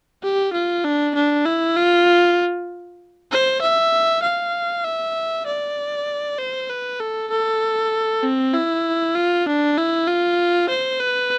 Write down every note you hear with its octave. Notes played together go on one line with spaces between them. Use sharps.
G4
F4
D4
D4
E4
F4
C5
E5
F5
E5
D5
C5
B4
A4
A4
C4
E4
F4
D4
E4
F4
C5
B4